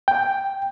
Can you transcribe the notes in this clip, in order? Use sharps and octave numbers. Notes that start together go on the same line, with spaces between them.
G5